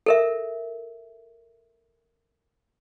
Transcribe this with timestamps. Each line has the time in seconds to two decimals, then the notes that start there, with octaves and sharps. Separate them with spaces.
0.06 A4 A#4 E5